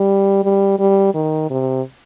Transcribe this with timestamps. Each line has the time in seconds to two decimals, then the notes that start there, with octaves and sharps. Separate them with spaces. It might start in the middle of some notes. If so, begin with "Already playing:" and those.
Already playing: G3
0.44 G3
0.79 G3
1.14 D#3
1.50 C3